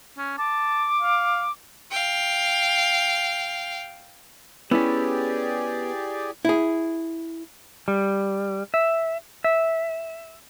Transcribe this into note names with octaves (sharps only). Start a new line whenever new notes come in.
C#4
A5 D6
F5
F5 G5
B3 C#4 E4 G4 G#4 D5
E4 G#4
G3
E5
E5